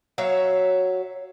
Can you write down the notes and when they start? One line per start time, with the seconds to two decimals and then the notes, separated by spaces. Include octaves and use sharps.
0.18 F#3 C#5 E5 F5